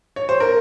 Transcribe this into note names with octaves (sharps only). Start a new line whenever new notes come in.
C#5
C5
A#4